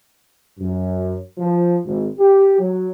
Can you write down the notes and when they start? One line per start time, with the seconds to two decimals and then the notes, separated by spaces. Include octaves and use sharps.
0.59 F#2
1.38 F3
1.85 G#1
2.19 G4
2.59 F#3